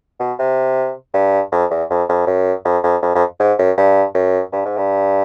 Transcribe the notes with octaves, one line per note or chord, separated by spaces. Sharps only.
B2
C3
G2
F2
E2
F2
F2
F#2
F2
F2
F2
F2
G#2
F#2
G2
F#2
G2
G#2
G2